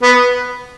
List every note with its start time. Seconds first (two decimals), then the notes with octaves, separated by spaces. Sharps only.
0.02 B3